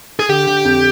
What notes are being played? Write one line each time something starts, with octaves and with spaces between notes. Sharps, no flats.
G#4
D3 G4
D3
F2